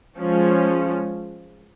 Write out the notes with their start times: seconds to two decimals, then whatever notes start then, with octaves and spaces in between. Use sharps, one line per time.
0.18 F3 G#3 C#4